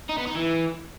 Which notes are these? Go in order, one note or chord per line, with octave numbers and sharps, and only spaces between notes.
D#4
B3
D#4
E3